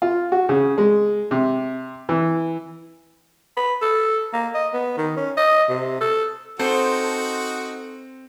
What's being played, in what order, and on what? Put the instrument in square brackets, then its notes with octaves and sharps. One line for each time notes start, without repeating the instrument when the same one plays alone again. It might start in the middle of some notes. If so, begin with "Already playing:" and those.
[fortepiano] F4
F#4
C#3
G#3
C3
E3
[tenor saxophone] B4
A4
A#3
D#5
B3
D#3
C#4
D#5
C3
A4
[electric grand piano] C4 [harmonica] D#4 F#4 [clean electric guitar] A4 [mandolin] C5